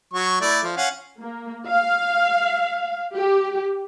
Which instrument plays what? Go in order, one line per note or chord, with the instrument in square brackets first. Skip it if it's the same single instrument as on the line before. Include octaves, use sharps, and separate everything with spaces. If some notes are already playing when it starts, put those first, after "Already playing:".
[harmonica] F#3 C#6
A3 E4 D5
F3
C#4 F5 F#5
[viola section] A#3
F5
G4